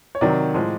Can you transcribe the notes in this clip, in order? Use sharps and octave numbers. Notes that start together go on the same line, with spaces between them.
C#5
C3 D#3 F#3 D5
A2 F3 G#3